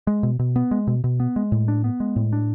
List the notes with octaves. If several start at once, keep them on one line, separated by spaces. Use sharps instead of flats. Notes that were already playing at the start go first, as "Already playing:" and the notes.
G#3
B2
B2
B3
G#3
B2
B2
B3
G#3
A2
D4
B3
G#3
A2
D4